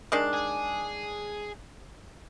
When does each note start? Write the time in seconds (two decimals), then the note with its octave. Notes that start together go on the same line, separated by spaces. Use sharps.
0.12 D#3 G#3 D4
0.33 G#4